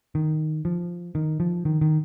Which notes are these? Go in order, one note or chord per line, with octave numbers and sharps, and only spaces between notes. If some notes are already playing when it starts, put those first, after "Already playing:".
D#3
F3
D#3
F3
D#3
D#3